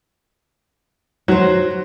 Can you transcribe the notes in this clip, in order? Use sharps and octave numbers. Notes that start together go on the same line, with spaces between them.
F#3 F#4 C5